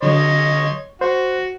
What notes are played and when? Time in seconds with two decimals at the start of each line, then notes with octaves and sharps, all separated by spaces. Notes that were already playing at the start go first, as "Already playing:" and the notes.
0.03 D3 F#3 C#5 D#5 C6
1.01 F#4 C5